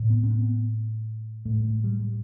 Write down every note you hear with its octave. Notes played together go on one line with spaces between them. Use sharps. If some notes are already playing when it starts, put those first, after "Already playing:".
Already playing: A2
B3
C4
B3
A2 A3
A3
G3
G3